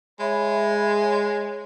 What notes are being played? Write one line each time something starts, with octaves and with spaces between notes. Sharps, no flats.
G#3 C#5 E5 B5
E5
C#5